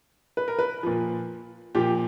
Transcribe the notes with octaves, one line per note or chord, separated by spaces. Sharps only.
B4
A#4
B4
A#2 F3
A#2 F3 G4